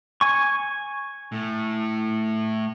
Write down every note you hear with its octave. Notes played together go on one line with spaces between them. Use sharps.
G#5 C#6
A2